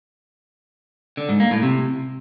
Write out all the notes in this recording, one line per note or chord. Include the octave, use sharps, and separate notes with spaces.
D3
G#2
A#3
A2
C3